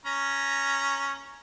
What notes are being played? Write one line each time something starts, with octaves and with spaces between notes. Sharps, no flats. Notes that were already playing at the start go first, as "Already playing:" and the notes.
C#4 A#5